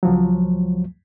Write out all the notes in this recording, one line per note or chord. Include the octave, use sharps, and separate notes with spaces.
C#2 F3 F#3